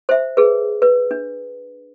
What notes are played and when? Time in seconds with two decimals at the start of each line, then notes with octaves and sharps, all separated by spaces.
0.09 C5 E5
0.37 G#4 B4
0.82 B4
1.11 D4